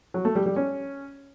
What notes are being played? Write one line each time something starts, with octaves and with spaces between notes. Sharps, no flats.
F#3
A3
G3
G3
C#4